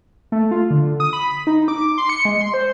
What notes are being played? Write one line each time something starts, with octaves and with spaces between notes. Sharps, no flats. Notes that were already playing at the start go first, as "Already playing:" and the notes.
A3
F4
D3
D#6
B5
D#4
D6
C6
C#7
G#3
C6
C5